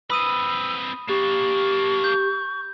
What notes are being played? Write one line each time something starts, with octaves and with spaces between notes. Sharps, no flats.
C4 B4 B5 D#6 E6 D#7
A#3 D4 G4 C#6
G6